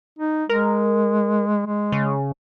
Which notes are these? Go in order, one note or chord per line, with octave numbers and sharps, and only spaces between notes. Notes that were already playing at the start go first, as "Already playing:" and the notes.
D#4
G#3 A#4
G#3
C#3